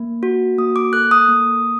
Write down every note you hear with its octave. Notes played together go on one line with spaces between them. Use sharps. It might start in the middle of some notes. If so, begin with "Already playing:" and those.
Already playing: A#3
F#4
A#3 D#6
D6
A4 F#6
D#6
A#3